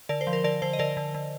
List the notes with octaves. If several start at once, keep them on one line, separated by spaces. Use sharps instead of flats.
D3 A#4 D5
C5
F3
A#4
D3 A#4 D5
D3 C5
D#5
D3 A#4 D5
D3
D3